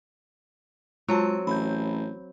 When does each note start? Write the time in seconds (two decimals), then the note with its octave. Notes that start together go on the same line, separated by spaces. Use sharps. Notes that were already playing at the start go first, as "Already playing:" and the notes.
1.08 F#3 G#3 C4 F4 A5
1.47 A1 B5 G6